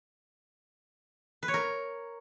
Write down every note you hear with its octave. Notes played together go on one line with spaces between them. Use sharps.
B4
C#5
A#4